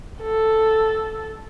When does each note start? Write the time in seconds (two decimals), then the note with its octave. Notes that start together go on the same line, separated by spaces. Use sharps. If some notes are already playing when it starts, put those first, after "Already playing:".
0.21 A4